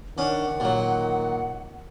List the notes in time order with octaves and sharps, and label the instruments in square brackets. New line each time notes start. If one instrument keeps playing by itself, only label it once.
[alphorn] D#3 [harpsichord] C#4 D4 [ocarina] F#5
[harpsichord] A#2 F#3